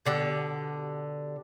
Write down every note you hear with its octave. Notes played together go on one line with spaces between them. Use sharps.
B2 D3 G4